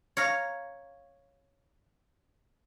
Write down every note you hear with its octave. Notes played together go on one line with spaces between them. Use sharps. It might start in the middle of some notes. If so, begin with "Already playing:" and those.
C#5 F5 A#5